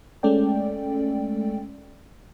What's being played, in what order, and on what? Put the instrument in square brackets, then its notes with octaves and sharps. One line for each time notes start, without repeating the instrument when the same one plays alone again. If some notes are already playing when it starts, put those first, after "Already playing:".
[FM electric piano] G#3 A3 C#4 A4 D5 G5